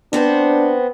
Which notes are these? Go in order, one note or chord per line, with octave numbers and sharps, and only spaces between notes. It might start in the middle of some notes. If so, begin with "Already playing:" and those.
B3 C4 D4 C5